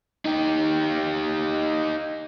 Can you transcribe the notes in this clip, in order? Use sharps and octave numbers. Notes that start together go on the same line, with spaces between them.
D#4 G4